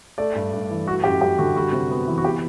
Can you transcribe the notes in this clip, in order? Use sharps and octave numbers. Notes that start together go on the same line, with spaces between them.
A3 D5
G2
G2
E3
A3 F#4
F#2 G4
F#2 G4
D3 F#4
G3 F#4
C3
B3
E3
F#4
B3 G4